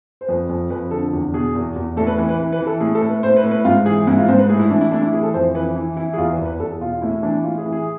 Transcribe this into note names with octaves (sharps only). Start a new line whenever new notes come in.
C5
F2 B4
F2
F2 B4
D3 A4
E2
B2 G#4
E2
E2
A2 A4
B4
E3
B4
E3
B4
E3
A4
A2 G#4
A4
A2
B4
A2 C5
B4
A2
B4
G#2 F4
E3 G#4
G#2 E4
F4
G#2 C5
B4
A2 G#4
E4
E3 D4
E4
A2 D4
E4
E3 G#4
A4
F2 C5
E3 B4
E3
E3 E4
G#4
E2 F4
B4
E2
B4
E2 A4
G#4
B2 F4
F4
A2 E4
E3 D4
A2 F4
G#4
E3
G#4